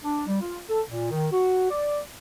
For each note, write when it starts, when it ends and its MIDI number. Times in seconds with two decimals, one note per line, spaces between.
0.04 0.27 62
0.27 0.39 55
0.41 0.60 65
0.69 0.81 69
0.88 1.07 46
1.11 1.27 51
1.32 1.67 66
1.71 1.99 74